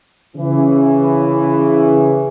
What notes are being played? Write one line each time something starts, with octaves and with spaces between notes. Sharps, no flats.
C#3 E3